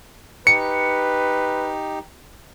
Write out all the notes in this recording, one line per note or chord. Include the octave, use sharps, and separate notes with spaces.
D#4 G4 B4 C#7